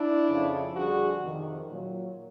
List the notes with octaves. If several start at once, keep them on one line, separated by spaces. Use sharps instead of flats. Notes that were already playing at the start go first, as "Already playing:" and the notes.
Already playing: D4 E4
F2 C#3 F3
F2 D3 G3 F#4 G#4
F2 C3 D#3
A#2 F#3